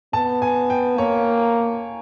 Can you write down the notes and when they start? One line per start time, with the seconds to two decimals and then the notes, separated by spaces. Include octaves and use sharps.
0.13 B3 A5
0.42 G#5
0.70 G5
0.98 A#3 C#5